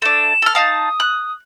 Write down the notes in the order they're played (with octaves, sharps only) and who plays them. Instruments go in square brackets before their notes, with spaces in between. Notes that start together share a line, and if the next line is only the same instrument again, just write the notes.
[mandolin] A3 D4 [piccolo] E7
[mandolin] A4 F6
[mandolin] D#4 F5 A5 [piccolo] D#6
[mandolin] F#6